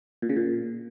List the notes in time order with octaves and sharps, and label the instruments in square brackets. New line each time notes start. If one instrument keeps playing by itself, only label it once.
[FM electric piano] A#2
C#3
A#2